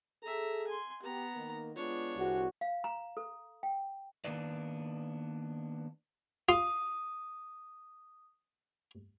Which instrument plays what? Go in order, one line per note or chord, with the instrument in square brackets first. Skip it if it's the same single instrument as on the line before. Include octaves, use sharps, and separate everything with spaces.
[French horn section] G#4 A4 [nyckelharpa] E5 A#5
[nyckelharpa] G#5 C6
[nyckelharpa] B3 A#5 [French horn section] G4
[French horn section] D#3 A#3
[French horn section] G#3 B3 F4 [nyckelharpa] D4 C#5
[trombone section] C2 F#4 [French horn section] D3 C4 G#4
[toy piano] F5
A#5
A4
G5
[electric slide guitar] D#3 A#3 B3 D4 B4 D5
[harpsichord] F4 [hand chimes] D#6